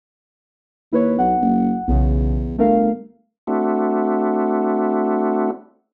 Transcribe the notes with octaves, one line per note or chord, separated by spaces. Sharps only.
D#2 E4 B4 C#5
B1 F#5
F#1
B1 E2 C#3
G1 A3 A#4 F5
A3 C4 D4 E4 F#4